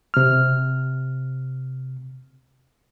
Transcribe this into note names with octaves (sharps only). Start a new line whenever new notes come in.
C3 F6